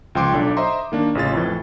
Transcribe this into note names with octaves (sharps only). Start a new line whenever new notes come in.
C#2 F3 G5 C6 D6 D7
B1 D4 A4
C5 D#5 E5 A#5 C6
D#3 A#3 D4
A1 C#3 F4 A6
F2 A2 E3